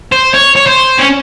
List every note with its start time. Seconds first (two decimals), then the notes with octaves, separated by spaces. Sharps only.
0.12 C5
0.34 C#5
0.56 C#5
0.67 C5
0.99 C#4